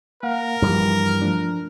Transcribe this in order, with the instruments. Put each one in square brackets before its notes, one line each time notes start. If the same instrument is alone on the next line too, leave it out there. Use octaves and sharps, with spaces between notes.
[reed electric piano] A#3 F5 F#5 [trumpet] A#4
[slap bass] G2 E3 G3 [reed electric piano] F3
[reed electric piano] F3 A3 D4